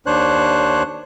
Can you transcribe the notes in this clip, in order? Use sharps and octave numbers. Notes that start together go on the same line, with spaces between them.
D#2 D4 C5 C#5 F#6